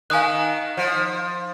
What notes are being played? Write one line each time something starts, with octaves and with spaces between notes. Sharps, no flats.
D#3 F5 G#5 D#6 F#6
F3